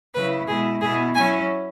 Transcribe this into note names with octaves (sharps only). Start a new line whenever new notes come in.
C#3 F#3 E4 B4
B2 G#3 E4 G#4
B2 B3 E4 G#4
F#3 C#4 E4 G#5